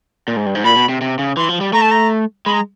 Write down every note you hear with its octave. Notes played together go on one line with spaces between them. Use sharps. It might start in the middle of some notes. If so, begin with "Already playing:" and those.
A#2
G#2
G2
G#2
A#2 B5
B2
C3
C3
C#3
E3 C6
F3
G3
A3 A#5
A5
A#5
G#3 B5
A#5